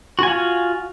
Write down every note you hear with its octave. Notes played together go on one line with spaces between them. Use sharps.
F4 F#4 G#5